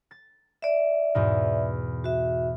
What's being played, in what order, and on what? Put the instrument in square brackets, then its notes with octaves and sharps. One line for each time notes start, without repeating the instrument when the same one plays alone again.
[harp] A6
[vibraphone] D5 E5
[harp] E2 G#2 B2
[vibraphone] F#4 E5